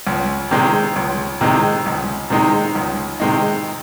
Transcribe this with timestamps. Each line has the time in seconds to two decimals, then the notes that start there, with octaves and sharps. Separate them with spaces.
0.07 C#2
0.51 C3 D#3 G#3 D#4
0.96 C#2
1.41 C3 D#3 G#3 D#4
1.86 C#2
2.30 C3 D#3 G#3 D#4
2.75 C#2
3.20 C3 D#3 G#3 D#4